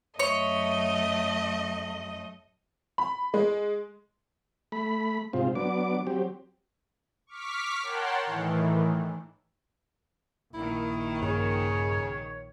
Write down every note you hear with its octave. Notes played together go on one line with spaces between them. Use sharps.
F#2 A3 C#5 D#5
B5
G#3
A3 B5
G#2 C3 C4 F4
F#3 B3 D4 D6
F#3 C4 G4
C#6 D6 F6 B6
A#4 C#5 F#5 G5 A5 C6
A2 D#3 E3
A#1 D#3 E4
G2 C#3 C#5